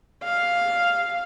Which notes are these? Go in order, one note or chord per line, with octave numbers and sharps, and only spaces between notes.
F5